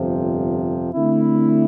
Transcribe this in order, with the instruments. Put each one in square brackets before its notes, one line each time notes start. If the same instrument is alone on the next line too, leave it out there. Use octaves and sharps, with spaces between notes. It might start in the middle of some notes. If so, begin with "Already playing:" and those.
Already playing: [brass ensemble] G1 F2 C3 F3
D3 A3 C4 E4